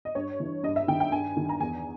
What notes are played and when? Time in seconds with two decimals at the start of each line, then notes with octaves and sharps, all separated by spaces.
0.05 D#5
0.15 G2 C#5
0.40 E3
0.63 G2 D#5
0.76 E5
0.88 D#3 G5
1.00 G5
1.12 G2 G#5
1.37 D#3
1.49 A#5
1.60 E2 G#5